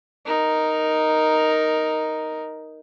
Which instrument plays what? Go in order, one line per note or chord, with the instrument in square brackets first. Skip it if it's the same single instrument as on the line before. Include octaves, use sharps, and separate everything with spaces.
[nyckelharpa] D#4 A#4